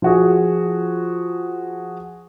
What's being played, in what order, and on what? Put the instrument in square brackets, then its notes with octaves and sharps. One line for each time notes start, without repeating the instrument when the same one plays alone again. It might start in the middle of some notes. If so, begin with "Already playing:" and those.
[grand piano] F3 F#4 G#4